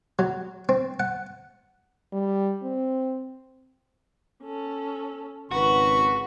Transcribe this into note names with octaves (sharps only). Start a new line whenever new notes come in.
F#3
C4
F#5
G3
C4
C#4 A4
G#1 C#3 F#4 B4 C#6